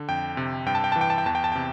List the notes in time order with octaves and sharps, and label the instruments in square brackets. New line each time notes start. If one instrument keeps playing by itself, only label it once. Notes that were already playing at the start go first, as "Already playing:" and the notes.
Already playing: [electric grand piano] D3
F2 G5
C3
G2 G5
A5
G5
A5
E3
G5
A5
G5
E2 A5
G5
A5
C3 G5